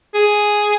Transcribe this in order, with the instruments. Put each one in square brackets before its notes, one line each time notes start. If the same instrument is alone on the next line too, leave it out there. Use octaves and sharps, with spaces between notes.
[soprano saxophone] G#4